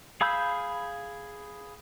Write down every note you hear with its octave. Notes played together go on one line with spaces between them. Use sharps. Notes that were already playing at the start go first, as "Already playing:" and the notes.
G#4 F5 B5 E6 G6